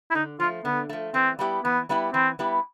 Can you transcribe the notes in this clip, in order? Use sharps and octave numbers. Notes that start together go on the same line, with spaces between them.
E4
D3 D#4
F3 A3 F4
D3 B3
F3 A3
E3 C4
G3 B3 E4 G4
E3 B3
G3 B3 E4 G4
E3 C4
G3 B3 E4 G4